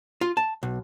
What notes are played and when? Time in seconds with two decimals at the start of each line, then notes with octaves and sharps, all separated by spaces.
0.21 F4
0.37 A5
0.63 B1